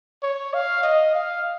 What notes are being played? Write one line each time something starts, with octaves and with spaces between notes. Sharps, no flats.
C#5
F5
D#5
F5